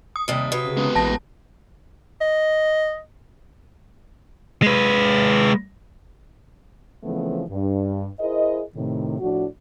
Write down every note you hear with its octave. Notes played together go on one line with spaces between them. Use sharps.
D#6
D#2 C3 G3
C3 F#3 B4
C#3
G#3 B3
A1 A5 A#6
D#5
G#3 B4
C#3 E3 F3 A3 B3 C4
G2
E4 G#4 A#4 C5 D#5
A2 C3 D#3
A2 F3 D4 F#4